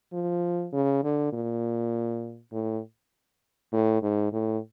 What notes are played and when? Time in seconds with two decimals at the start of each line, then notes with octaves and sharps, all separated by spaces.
0.14 F3
0.73 C#3
1.04 D3
1.33 A#2
2.52 A2
3.73 A2
4.03 G#2
4.33 A2